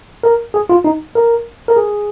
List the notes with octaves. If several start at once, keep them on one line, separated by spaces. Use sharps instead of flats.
A#4
G#4
F4
D#4
A#4
A#4
G#4